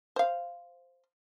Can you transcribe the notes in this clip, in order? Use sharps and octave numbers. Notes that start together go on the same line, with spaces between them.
C5 F5